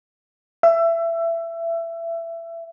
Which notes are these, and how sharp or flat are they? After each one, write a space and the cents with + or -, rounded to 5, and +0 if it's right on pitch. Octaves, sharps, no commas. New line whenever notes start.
E5 +20